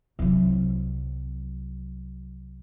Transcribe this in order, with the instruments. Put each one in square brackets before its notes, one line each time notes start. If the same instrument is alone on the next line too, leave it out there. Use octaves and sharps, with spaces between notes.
[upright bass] C2 F#3